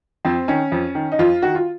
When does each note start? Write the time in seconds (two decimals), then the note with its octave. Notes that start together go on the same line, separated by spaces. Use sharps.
0.25 F2 C4
0.48 D#3 C#4
0.72 F2
0.95 D#3
1.12 D#4
1.19 F2 F4
1.42 D#3 F#4
1.55 F4